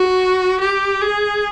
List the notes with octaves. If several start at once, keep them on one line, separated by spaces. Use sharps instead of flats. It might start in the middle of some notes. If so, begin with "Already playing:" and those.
Already playing: F#4
G4
G#4